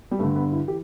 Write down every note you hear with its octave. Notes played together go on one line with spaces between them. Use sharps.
G3
G2 D3 A3
B3
E4
E3 G4